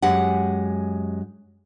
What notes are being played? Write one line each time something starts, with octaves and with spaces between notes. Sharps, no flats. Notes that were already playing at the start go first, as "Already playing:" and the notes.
F#2 G#3 G4 F#5